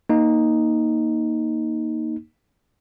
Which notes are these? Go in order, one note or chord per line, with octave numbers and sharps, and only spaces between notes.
A#3 D#4